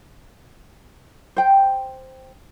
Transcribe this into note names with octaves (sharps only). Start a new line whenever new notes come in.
C5 G5